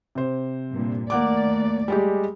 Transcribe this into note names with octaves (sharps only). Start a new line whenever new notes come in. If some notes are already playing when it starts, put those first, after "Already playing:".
C3 C5
G2 A#2
D#2 A3 A#3 D5 F#5 D6
G3 G#3 G4